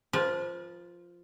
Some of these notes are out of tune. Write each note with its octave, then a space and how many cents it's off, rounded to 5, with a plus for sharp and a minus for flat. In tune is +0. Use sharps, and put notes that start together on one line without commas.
F3 +0 B4 -40